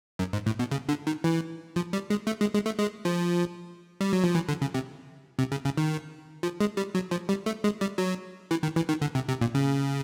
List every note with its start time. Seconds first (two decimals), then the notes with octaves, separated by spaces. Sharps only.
0.19 F#2
0.33 G#2
0.46 A2
0.59 B2
0.71 C#3
0.89 D3
1.07 D#3
1.24 E3
1.76 F3
1.93 G3
2.10 G#3
2.27 A3
2.41 G#3
2.54 G#3
2.66 A3
2.79 G#3
3.05 F3
4.01 G3
4.13 F#3
4.24 F3
4.35 E3
4.49 D3
4.62 C#3
4.74 C3
5.39 C3
5.52 C#3
5.65 C#3
5.78 D#3
6.43 F3
6.61 G#3
6.77 G3
6.95 F#3
7.11 F3
7.29 G3
7.46 A3
7.64 G#3
7.81 G3
7.98 F#3
8.51 E3
8.63 D#3
8.76 E3
8.89 D#3
9.02 D3
9.15 C3
9.29 C3
9.41 A#2
9.55 C#3